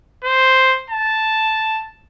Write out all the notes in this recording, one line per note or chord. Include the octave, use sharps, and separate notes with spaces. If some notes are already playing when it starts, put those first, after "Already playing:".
C5
A5